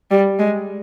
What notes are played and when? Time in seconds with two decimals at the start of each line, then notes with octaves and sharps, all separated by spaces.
0.11 G3
0.39 G#3